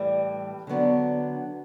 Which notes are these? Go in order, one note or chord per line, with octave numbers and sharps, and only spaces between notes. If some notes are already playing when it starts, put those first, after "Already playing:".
Already playing: A2 E3 G3
D3 F#3 B3 D4